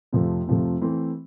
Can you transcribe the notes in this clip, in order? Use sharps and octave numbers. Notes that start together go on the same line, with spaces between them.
F2 C3 F3 A3 C4
F2 C3 F3 A3 C4
E3 A3 C4